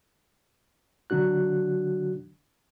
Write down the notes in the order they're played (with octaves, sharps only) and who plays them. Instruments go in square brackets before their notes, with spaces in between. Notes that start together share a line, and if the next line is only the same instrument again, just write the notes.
[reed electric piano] D3 F#3 D4 F#4 F#6